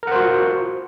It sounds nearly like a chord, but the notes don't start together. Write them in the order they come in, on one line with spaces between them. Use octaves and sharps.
A#4 F#5 C5 F#4 F4